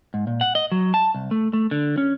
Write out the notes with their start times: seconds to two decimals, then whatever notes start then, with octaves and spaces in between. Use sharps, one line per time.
0.14 G#2
0.27 A#2
0.41 F#5
0.55 D#5
0.72 F#3
0.94 A5
1.15 C2
1.31 A3
1.53 A3
1.71 D3
1.98 C#4